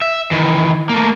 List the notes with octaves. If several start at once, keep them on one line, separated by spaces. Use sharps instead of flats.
E5
D#3 E3
A3 A#3